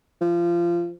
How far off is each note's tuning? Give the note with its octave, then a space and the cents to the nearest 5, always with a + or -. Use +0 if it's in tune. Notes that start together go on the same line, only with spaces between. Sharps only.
F3 -25